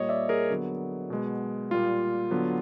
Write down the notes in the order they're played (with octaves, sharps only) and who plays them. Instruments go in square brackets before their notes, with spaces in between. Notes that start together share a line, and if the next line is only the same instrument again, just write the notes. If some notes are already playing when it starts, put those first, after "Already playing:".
Already playing: [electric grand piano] A#2 G3 A#3 C#5 D#5
D5 E5
G#4 A#4
D3 F#3 B3
B2 G#3 B3
A#2 G3 A#3 F4
D3 F#3 B3